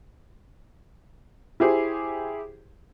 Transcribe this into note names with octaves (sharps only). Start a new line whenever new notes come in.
E4 G4 G#4 C5